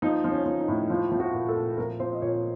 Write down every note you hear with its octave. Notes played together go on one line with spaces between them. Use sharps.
F3 D#4
F3
C#4
F3
D#4
A2
F3 F4
F3
F#4
A#2
A4
A#2
F3 A#4
F3 C5
D#5
A#2 C#5